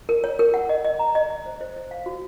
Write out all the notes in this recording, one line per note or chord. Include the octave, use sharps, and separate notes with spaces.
A#4
C#5
A#4
F#5
D#5
D#5
A#5
D#5
D#5
C5
C5
C5
F5
F#4